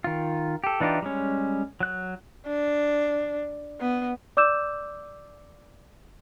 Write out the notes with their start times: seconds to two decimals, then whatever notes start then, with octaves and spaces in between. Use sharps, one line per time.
0.04 D#3 F4
0.64 G4 A4
0.80 E3 D4 D#4 F4 G4
1.02 G3 G#3 C#4
1.80 F#3 F#6
2.47 D4
3.80 B3
4.37 D5 D6 E6 G6 E7